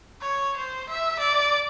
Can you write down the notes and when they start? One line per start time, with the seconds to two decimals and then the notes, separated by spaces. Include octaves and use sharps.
0.21 C#5
0.57 C5
0.89 E5
1.20 D5